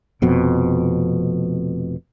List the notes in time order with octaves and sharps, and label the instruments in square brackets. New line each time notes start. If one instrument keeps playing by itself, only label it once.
[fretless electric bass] F1 F2 B2 C4